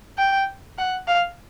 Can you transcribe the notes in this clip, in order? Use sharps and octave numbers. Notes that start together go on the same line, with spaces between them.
G5
F#5
F5